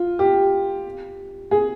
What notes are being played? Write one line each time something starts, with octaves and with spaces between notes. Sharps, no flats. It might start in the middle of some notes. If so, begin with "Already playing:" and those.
Already playing: F4
G4
G#4